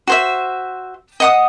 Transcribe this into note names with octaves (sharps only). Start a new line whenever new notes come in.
F#4 C5 E5
D#5 F#5 D#6